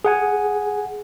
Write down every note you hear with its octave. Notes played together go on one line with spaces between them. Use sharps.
G#4 F#5 G#5